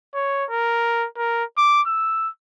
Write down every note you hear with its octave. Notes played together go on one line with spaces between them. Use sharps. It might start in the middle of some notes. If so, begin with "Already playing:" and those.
C#5
A#4
A#4
D6
E6